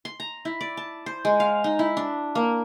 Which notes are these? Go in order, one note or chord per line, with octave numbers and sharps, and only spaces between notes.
C6
A#5
E4
D5
A5
C5
G#3
F5
D#4
E4
D4
A#3